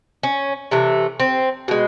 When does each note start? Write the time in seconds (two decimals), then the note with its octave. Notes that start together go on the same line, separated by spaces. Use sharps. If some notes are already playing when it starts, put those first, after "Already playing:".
0.23 C#4
0.71 C3 E3 A3
1.20 C4
1.68 B2 G#3